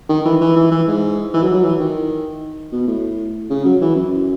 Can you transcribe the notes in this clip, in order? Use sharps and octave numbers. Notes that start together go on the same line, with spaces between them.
D#3
E3
E3
E3
E3
G#2
E3
F#3
F#3
E3
D#3
B2
A2
C#3
F#3
E3
F#2